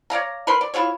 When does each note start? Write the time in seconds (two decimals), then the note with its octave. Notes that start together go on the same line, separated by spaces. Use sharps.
0.10 C#5 D5 F5 A#5
0.47 A#4 B4 B5 C6
0.61 D5
0.74 E4 F4 G#4 C#5